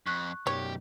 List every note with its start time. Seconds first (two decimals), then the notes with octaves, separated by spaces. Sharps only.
0.06 F2 C#6 F#6
0.47 B1 F#2 G4 C#5